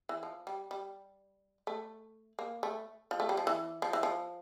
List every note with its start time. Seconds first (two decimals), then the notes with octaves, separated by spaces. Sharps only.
0.09 E3
0.23 F3
0.47 G3
0.71 G3
1.67 A3
2.39 A#3
2.63 A3
3.11 F3
3.20 A3
3.29 G3
3.37 F3
3.47 E3
3.82 F3
3.93 E3
4.03 F3